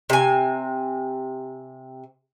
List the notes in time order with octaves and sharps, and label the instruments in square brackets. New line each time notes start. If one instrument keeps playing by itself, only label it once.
[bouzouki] C3 G#5